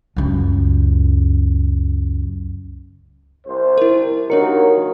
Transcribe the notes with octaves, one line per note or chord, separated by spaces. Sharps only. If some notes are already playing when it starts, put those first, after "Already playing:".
C#2 F#2
C2 C5
E4 A#4
D#2 D#3 F#3 D4 A#4 C#5 C#7